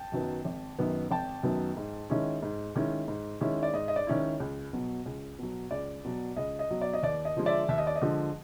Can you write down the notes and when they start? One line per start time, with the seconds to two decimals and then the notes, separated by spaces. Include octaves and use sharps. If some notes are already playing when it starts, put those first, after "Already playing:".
Already playing: G5 A5
0.12 F#2 D#3 F#3 B3
0.45 G#1
0.78 F#2 D#3 F#3 B3
1.11 G#1 G5 A5
1.43 F#2 D#3 F#3 B3
1.77 G#2
2.10 D#3 G#3 C#4 E4
2.42 G#2
2.75 D#3 G#3 C#4 E4
3.08 G#2
3.41 D#3 G#3 C#4 E4
3.63 D5
3.73 G#2 D#5
3.88 D#5
3.96 D5
4.07 D#3 G#3 C#4 E4
4.40 C#2
4.73 B2 F#3
5.06 C#2
5.39 B2 F#3
5.71 C#2 D5
6.04 B2 F#3
6.36 C#2 D#5
6.59 D#5
6.71 B2 F#3
6.81 D5
6.93 D#5
7.03 D#2 D5
7.25 D#5
7.36 D3 F3 G#3
7.46 D5 E5
7.68 D#2 E5
7.78 D#5
7.87 D5
7.96 D#5
8.02 D3 F3 G#3